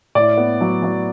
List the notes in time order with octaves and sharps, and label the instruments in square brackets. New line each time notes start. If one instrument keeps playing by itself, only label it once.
[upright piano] A2 D5
B3
F#3
F#3